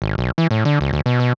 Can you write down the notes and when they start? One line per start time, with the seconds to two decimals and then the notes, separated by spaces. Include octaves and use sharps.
0.02 G#1
0.18 B1
0.38 E3
0.51 A2
0.65 D3
0.81 C#2
0.93 D2
1.06 B2
1.20 B2